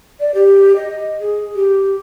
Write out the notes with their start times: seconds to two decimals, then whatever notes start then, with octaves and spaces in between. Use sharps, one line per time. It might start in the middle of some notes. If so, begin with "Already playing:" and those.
0.20 D5
0.35 G4
0.76 D#5
1.20 G#4
1.55 G4